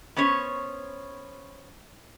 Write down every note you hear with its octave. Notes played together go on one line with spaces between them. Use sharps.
B3 C#4 C5 C#5